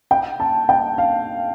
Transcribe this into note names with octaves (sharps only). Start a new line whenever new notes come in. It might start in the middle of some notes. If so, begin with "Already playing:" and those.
G5
A5
G5
F5